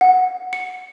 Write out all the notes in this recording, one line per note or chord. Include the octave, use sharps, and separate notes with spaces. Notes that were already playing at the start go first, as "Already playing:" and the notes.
F#5
C#7